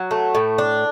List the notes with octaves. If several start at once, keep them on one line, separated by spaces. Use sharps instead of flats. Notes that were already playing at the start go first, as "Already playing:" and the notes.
Already playing: F#3
A3
A2
D4